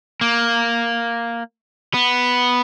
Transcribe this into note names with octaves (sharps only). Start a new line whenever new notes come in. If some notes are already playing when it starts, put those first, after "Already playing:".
A#3
B3